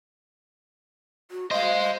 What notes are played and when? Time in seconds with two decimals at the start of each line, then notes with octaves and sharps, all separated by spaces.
1.31 F#4
1.51 C5 D#5 F5 C6